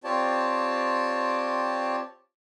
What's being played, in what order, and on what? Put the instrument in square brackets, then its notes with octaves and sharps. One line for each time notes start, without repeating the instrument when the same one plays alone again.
[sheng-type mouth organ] C4 F4 G4 C#5 D5 A5